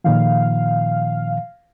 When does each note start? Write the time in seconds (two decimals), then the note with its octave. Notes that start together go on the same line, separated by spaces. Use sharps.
0.04 A#2 D#3 F3 F5